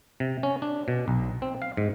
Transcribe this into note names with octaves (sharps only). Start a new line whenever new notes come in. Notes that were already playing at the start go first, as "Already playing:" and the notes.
C3
C#4
D4
B2
B1
C4
F5
G#2